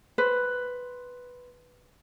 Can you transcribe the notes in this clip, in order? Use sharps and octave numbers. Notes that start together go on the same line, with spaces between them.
B4 C5